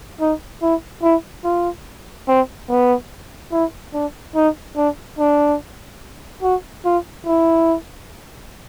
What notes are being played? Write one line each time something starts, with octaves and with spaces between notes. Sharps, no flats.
D#4
E4
E4
F4
C4
B3
E4
D4
D#4
D4
D4
F#4
F4
E4